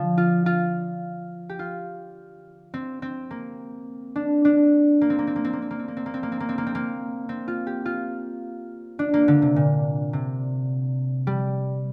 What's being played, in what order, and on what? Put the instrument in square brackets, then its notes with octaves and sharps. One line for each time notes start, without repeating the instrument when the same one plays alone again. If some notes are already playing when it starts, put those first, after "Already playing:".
Already playing: [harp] D3 F3
F4
F4
G4
F4
C4
C4
A#3
D4
D4
A#3
C4
A#3
C4
A#3
C4
A#3
C4
A#3
C4
A#3
C4
A#3
C4
A#3
C4
A#3
C4
A#3
C4
A#3
C4
F4
G4
F4
D4
A#3
D3
C3
A#2
C3
G3